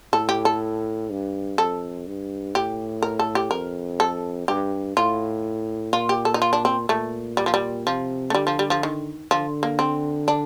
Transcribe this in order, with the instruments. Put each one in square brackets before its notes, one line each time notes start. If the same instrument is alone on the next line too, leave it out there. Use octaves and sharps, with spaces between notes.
[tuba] A2 [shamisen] A4
[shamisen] G4
A4
[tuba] G2
[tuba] F2 [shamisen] A4
[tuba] G2
[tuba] A2 [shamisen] G4
[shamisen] A#4
A4
G4
[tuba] F2 [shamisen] A#4
[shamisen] A4
[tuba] G2 [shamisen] G4
[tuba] A2 [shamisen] F4
[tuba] A#2 [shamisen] F4
[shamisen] G4
A4
D#4
F4
D4
C4
[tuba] A#2 [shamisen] A3
[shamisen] G3
F3
G3
[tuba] C3 [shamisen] F3
[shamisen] A3
[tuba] D3 [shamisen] G3
[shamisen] F3
G3
F3
D#3
[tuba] D3 [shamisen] F3
[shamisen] A#3
C4
D4